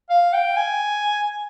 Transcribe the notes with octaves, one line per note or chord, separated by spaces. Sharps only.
F5
G5
G#5